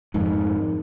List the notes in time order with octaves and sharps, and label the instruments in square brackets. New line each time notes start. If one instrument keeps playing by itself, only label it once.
[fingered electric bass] F2 G#2 [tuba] D#3